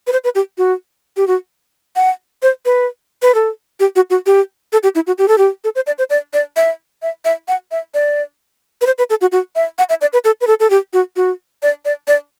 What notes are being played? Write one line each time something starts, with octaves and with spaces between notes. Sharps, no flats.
B4
C5
B4
G4
F#4
G4
F#4
F#5
C5
B4
B4
A4
G4
F#4
F#4
G4
A4
G4
E4
F#4
G4
A4
G4
A4
C5
D5
C5
D5
D5
E5
E5
E5
F#5
E5
D5
B4
C5
B4
A4
F#4
F#4
E5
F#5
E5
D5
B4
A4
B4
A4
A4
G4
F#4
F#4
D5
D5
D5